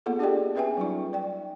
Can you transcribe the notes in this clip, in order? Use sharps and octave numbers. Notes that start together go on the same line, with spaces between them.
A#3 B3 F4 G#4 A4
D4 G4 G#4 D5 D#5 G5
C#4 G#4 B4 E5 G5 G#5
F#3 G3 D#4 F4
D5 G5